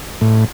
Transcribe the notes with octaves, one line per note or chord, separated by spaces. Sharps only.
A2